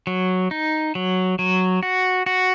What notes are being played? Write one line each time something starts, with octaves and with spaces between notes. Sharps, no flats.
F#3
D#4
F#3
F#3
F#4
F#4